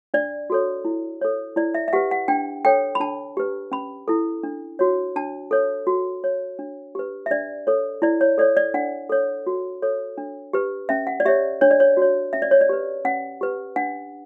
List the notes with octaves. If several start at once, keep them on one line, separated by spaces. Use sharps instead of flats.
D4 D5
F#4 A4 C#5
E4
A4 C#5
E4 D5
E5
E5
G4 B4 F#5
F#5
D4 G5
A4 C#5 G5
B5
D4 A5
G4 B4
C#4 B5
E4 A4
D4
F#4 C#5
D4 A5
A4 C#5
F#4
C#5
D4
G4 B4
E5
D4 D5
A4 C#5
E4 D5
C#5
A4 C#5 D5
D5
D4 F#5
A4 C#5
F#4
A4 C#5
D4
G4 B4
C#4 E5
F#5
D5
G4 C#5 E5
D4 C#5
D5
C#5
F#4 C#5
C#4 E5
D5
C#5
D5
G4 B4
C#4 F#5
G4 B4
D4 F#5